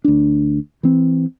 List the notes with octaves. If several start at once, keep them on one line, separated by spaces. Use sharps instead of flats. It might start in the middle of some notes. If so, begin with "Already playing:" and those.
D2 D4
E3 C4